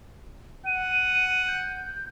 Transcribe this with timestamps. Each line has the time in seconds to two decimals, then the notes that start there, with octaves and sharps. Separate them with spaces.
0.66 F#5 D#7
1.48 G6